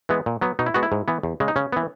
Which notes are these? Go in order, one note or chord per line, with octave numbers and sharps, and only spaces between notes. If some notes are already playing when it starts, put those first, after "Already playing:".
E3 G#3 B3
A#2
F#3 B3
B2 D#4
E4
G#3 B3 F#4
E4
G#2
E3 B3
E2
C#3 G#3
D#4
C#3 C#4
E3 B3